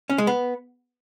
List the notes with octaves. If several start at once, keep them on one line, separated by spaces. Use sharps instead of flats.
C#4
G#3
B3